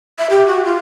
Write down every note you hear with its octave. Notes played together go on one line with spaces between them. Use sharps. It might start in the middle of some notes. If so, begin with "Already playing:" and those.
E5
G4
F#4
F4